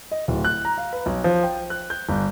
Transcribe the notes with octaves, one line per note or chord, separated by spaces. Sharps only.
D#5
D1
F#6
A#5
F5
B4
B1
F3
G5
F#6
G6
G1